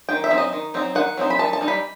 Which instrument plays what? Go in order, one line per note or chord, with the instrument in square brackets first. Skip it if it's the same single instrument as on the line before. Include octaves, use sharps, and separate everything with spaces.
[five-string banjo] D#3 G5
E5
F#3 C4 D#4
D#5
D#3
F#3 C4 D#4
D#3 F#5
F#3 C4 D#4
B5
D#3 A5
A5
G3 D#4
B5